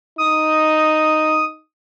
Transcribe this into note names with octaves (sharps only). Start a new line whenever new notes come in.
D#4 D#6